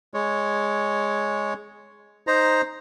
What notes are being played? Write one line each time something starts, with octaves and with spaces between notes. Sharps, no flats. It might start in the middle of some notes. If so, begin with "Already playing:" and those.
G#3 C#5
D#4 C5 A#5